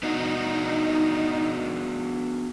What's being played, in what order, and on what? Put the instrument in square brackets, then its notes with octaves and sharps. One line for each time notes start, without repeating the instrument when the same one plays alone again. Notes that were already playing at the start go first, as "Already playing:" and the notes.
[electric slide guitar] B3 D4 F#4 [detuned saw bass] D#4